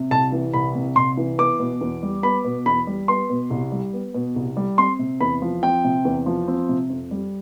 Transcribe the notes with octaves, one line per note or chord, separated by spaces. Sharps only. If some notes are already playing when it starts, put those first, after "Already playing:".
Already playing: C3
C2 A5
E3
C2 B5
C3
C2 C6
E3
B3 D6
B2
E2
G3
B3 B5
B2
E2 B5
G3
B3 C6
B2
C2
G3
B3
B2
C2
G3
C4 C6
C3
E2 B5
F3
C4 G5
C3
E2
F3
C4
C3
F2
G3